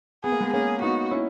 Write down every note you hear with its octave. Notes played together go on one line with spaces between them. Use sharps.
B3 G#4
A#3
G#3 B3
A#3 C#4 G#4
B3 D#4 F#4
C#4 E4